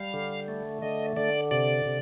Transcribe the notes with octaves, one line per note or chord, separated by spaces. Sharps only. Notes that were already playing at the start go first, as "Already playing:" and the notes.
Already playing: G3 F5
D3
A3
D3 D#5
D3 D5
C3 D5
C3